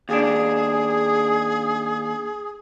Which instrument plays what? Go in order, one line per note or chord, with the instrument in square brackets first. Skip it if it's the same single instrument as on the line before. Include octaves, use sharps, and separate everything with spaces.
[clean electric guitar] D#2 D4 [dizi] G#4